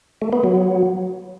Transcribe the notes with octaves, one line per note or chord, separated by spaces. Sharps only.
A3
B3
F#3